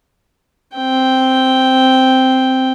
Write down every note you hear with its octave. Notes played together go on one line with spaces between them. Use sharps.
C4 G5